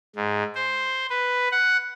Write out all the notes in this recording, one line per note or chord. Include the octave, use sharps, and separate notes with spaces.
G#2
C5
B4
F#5